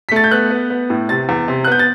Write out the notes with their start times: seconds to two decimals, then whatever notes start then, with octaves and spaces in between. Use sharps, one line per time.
0.09 B6
0.11 A3 A6
0.24 G6
0.31 B3 F#6
0.50 B3
0.70 B3
0.90 A2
1.09 C3 A6
1.29 E2
1.48 C3
1.64 F#6
1.67 B3 G6
1.79 A6